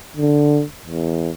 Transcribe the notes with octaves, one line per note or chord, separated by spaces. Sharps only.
D3
E2